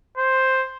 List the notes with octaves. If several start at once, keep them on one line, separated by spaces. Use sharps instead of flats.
C5